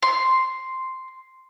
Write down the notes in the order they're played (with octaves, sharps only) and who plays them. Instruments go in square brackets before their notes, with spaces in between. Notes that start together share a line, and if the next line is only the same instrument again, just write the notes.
[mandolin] C6